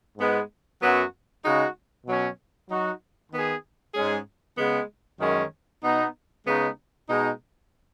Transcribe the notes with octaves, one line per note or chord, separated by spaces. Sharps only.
G#2 G#3 B3
F#2 F#3 B3 F#4
C#3 G#3 D#4 F#4
B2 F#3 C#4
F#3 D#4 F#4
D#3 B3 G#4
G#2 G#3 C#4 G#4
C#3 G#3 B3
F#2 D#3 G#3 C#4
B2 B3 D#4
C#3 G#3 B3 D#4
B2 G#3 D#4